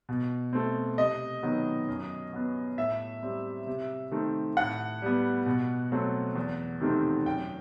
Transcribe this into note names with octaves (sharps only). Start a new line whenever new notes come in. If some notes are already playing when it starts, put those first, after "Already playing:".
B2
A3 C4
C3 D#5
D#3 F#3 B3
F#2
F#3 B3
A2 E5
G3 C4
C3
D#3 A3 C4
A2 F#5
G3 B3
B2
F#3 A3 C4
E2
C3 D#3 A3 C4
F#2 G5